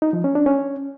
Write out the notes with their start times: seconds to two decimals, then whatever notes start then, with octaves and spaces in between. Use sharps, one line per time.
0.02 D#4
0.13 F3
0.24 C#4
0.35 D4
0.46 C#4